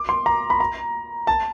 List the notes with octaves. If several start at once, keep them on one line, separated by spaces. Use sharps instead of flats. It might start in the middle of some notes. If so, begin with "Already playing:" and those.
Already playing: D6
C6
A#5
B5
A#5
A5